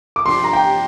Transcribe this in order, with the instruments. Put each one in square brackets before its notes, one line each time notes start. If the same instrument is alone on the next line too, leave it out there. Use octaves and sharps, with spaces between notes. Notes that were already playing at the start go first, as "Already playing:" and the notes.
[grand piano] D6
[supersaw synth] C3 F3 D4 G4 [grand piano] C6
[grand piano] A#5
G5